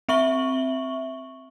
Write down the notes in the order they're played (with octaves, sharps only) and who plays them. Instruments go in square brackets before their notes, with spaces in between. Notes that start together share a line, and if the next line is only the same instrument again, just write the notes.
[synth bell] C4 E5 C#6 F#7 G7